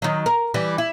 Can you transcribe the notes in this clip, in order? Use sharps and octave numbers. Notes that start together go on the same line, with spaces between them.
D#3 F#3
A#4
E3 G3
E4